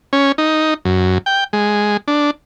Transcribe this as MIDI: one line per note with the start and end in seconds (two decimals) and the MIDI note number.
0.13 0.32 61
0.38 0.74 63
0.85 1.18 42
1.26 1.44 79
1.53 1.97 56
2.08 2.31 62